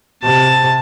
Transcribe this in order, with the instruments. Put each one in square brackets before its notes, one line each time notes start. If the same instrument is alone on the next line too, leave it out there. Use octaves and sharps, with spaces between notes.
[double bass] C3 [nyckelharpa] A5